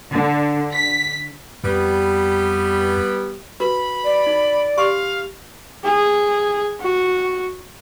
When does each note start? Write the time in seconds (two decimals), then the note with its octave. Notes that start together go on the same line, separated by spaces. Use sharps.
0.12 D3
0.73 B6
1.64 F2 G3 B3
3.60 F#4 A#4 B4 B5
4.04 D5
4.27 D#4
4.77 G4 F5 C6 C#6
5.84 G#4
6.80 F#4